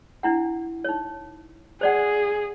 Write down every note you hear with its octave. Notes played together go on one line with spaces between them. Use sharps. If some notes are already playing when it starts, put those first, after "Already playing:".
D4 E4 F#5
D#4 C#5
G#4 C5 D5 F#5